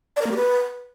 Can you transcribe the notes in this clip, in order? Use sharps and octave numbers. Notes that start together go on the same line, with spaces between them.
D5
A#4
A#3
G4
B4